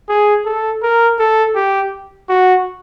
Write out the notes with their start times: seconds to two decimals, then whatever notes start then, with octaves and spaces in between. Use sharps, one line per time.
0.09 G#4
0.45 A4
0.83 A#4
1.19 A4
1.55 G4
2.29 F#4